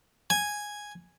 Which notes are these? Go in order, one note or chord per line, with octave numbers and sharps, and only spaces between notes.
G#5